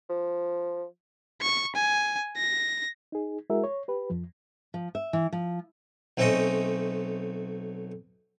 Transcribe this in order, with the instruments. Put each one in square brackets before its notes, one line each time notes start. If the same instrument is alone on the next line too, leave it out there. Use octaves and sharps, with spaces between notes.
[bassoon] F3
[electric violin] C#6
G#5
A#6
[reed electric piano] D#4 G#4
G#3 E4 F#4 G#4 A#4 E5
C#5
G4 B4
F2 F3
[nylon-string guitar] F3
E5
E3
F3
[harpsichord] B1 A3 C4 C#4 D#5 G5